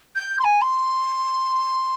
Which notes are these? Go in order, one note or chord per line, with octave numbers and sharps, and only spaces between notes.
G6
C6
G#5
C6